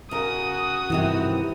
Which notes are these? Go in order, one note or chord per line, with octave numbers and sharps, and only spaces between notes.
C#3 F#4 A#4 D#6
G2 C3 D#3 E3 E4